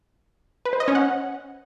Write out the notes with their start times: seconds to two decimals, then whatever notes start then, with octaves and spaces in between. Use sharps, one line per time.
0.65 B4
0.73 C5
0.80 D#5
0.88 C#4
0.95 F#5